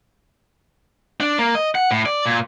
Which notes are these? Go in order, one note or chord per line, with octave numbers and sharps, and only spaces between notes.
D4
A#3
D#5
F#5
A2
D5
A#2